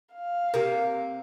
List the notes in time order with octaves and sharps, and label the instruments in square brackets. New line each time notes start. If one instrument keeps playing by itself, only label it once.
[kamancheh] F5
[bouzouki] C3 A#3 [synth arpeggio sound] G4 A#4